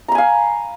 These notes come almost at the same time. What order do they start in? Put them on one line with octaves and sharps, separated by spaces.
A#5 B5 G#5 F5